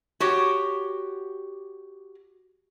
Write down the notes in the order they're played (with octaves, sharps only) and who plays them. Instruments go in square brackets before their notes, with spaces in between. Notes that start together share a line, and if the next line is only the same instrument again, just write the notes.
[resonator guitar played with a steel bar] F#4 G4 C#5